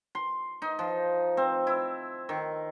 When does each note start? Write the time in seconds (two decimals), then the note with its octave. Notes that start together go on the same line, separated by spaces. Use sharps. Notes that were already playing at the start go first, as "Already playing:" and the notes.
0.15 C6
0.62 D#4
0.79 F3
1.37 C4
1.67 E4
2.29 D#3